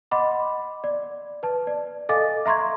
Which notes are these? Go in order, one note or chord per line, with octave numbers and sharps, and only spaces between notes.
D#5 F#5 B5 C6 D6
D5
B4 A5
D5
A4 D#5 F5 G#5 D6 A6
E5 A#5 C6 C#6 G#6